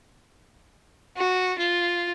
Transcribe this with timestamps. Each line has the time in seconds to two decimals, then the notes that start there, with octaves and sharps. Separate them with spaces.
1.17 F#4
1.58 F4